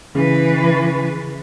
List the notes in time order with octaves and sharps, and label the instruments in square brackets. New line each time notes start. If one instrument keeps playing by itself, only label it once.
[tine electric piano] C#3 [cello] E3 B4